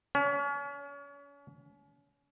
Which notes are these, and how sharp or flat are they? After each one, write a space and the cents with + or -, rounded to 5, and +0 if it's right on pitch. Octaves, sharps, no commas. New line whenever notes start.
C#4 +35